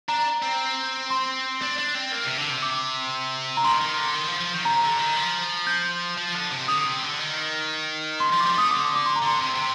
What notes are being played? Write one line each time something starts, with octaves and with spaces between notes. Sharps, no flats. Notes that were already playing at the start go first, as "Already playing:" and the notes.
D4 A#5
C4
C6
D4
D4
C4
A#3
C3
D3
C3
D6
A#5
D#3 C6
D#3
D3
D#3
F3
F3
D#3
C3 A#5
D3
D#3
F3
G6
F3
D3
C3
D3 D#6
C3
D3
D#3
C6
F3 C6
D6
G3 C6
A3 D#6
D3 D6
D6
C6
A#5
D3 C6
C3
C3